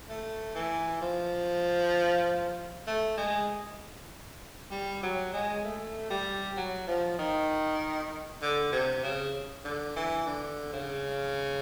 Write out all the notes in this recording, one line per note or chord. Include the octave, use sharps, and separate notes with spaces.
A3
E3
F3
A3
G#3
G3
F#3
G#3
A3
G3
F#3
F3
D#3
D3
C3
C#3
D3
E3
D3
C#3